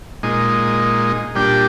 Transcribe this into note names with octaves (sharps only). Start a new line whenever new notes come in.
A#2 G#3 D#4
A#2 G3 D4 G4